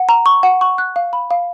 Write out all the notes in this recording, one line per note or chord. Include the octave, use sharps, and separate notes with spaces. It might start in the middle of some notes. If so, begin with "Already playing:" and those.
Already playing: F#5
A#5
C#6
F#5
C#6
F#6
F5
B5
F5